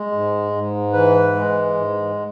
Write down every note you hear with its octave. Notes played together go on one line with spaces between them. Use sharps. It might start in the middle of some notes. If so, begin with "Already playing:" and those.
Already playing: G#3
G#2
G#2
E3 B4
G#3
G#2